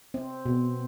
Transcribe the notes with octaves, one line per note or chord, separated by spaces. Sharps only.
C4
B2